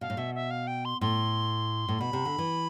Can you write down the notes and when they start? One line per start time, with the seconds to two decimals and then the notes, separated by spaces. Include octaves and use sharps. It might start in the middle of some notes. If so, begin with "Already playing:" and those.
0.01 B2 F5
0.10 A2
0.17 B2 E5
0.35 E5
0.51 F5
0.67 G5
0.85 C6
1.01 A2 C6
1.88 A2
2.00 B2 B5
2.13 C3
2.25 D3
2.38 E3